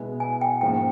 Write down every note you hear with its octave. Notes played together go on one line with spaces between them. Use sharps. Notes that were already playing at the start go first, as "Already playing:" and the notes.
Already playing: B2 G#3 B3 E4 G#4
G#5
G5
G#2 F3 A#3 C#4 G5